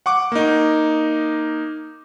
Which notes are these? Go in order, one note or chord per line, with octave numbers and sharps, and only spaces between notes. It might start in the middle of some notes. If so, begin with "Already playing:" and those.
F#5 C#6 D6
A#3 D#4